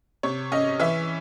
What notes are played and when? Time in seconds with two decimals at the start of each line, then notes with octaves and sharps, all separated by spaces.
0.23 C3 C#5
0.52 C#4 D#5
0.80 E3 E5